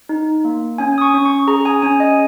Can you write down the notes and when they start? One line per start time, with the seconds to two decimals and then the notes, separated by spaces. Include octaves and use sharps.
0.09 D#4
0.45 A#3
0.78 C#4 G#5
0.98 D#6
1.01 C#6
1.14 C#4
1.25 C#6
1.48 G#4 A#5
1.65 G#5
1.82 C#4 G#5
2.00 D#5